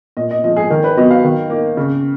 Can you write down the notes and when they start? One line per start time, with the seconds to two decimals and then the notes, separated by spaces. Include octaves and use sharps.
0.17 A#2 D#5
0.31 D#5
0.44 F3 D#5
0.48 G#3
0.56 G#4
0.70 D#3 A#4
0.84 B4
0.97 F#3 B3 D#5
1.10 F5
1.24 D#3
1.50 A#3 D#4
1.77 C#3